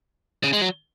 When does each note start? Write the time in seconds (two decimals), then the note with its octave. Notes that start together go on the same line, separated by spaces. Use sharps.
0.44 C#3
0.53 G#3
0.61 F#3